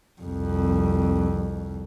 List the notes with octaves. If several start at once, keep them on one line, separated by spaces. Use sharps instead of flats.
C2 F2